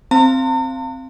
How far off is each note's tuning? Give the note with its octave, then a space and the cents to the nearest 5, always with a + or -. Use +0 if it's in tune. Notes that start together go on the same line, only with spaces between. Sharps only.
C4 +0 F5 -15 A#5 -45